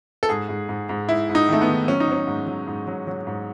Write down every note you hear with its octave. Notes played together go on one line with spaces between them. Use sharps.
A4
G#2 G#4
G#2
G#2
G#2
G#2 E4
G#2
D#4
D#3 A3
B3
D#3
F#3 C#4
D#4
F#3 C#4
G#2
F#3
G#2
F#3
F#3
G#2